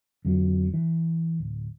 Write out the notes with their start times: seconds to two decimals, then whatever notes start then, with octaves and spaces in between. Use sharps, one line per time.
0.25 F2 D3 F3 F#3
0.74 E3
1.40 D1